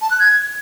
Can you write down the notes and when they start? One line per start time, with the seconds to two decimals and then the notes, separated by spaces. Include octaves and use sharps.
0.02 A5
0.11 F#6
0.20 G#6